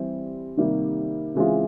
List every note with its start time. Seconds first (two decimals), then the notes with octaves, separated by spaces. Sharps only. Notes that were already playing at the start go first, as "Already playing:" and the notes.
Already playing: E3 G3 C4
0.57 C3 D#3 G3 A#3
1.35 C#3 E3 G#3 C4 F4